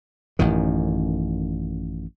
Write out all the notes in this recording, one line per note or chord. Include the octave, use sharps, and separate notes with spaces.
A1 F#2 D#3